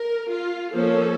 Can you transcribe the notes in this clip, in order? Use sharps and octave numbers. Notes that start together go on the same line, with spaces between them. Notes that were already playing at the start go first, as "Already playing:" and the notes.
Already playing: A#4
F4
F3 A#3 C#4 A4